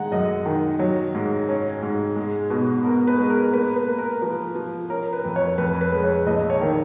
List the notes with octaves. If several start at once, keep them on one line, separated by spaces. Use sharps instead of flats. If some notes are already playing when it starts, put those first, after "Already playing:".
Already playing: D#3 G#3 F#5 A#5
F#2 D#5
D#3
F#3
G#2
C#4
G#2
G#3
B2
B3 A#4
B4
G#3
A#4
A#3 B4
B4
A#3
A#4
F3 B4
F3
C#4 A#4
A#4
B4
F2
C#5
F2 B4
B4
G#3
C#5
A#1 D#5
C#5
D#3